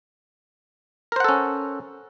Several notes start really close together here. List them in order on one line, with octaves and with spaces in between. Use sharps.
A#4 C5 F#5 A4 C#4